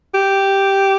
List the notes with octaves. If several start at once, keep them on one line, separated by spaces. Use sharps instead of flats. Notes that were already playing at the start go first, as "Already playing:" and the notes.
G4